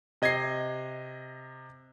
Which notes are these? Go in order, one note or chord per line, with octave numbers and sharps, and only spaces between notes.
C3 D#5 G#6 A#6 C7